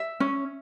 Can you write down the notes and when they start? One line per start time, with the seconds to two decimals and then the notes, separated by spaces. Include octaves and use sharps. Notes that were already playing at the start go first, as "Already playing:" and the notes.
Already playing: E5
0.20 C#4